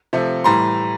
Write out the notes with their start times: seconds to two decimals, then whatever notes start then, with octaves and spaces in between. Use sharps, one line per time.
0.13 C3 F3 A3
0.44 A2 E3 G3 A#5 C6